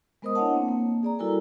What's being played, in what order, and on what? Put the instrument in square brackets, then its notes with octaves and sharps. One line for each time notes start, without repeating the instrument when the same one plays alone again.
[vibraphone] G#3 B3 A#4 C5 D#5 D#6
D4 E4 C#5 D#5 F#5 A5
A#3 C4
A#3
G#4 D5 A#5
G3 E4 F#4 A4 A#4 G#5